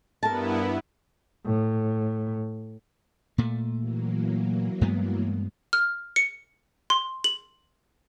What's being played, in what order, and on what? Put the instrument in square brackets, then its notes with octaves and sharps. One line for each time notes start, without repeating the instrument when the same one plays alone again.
[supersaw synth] G2 B3 E4 [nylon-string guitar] A#4 A5
[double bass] A2
[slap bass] A#2 A3
[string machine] E3 F#3 A#3
[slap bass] G2 G#3 B3
[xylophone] F6
C#7
C6
F#7